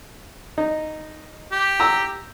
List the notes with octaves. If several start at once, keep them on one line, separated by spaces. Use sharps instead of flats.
D#4
G4
A#5 E6